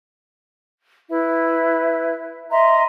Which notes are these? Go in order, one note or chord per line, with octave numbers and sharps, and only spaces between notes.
E4 B4 E5
D#5 E5 A#5 C6